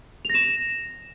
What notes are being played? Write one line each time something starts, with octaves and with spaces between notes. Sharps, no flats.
A#6 E7 F7